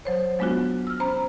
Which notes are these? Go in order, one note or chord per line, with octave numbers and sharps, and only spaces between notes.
F#3 C5 C#5
F#3 G#3 B3 D4 F4 F#4
E6 F6
C#4 C5 A#5 B5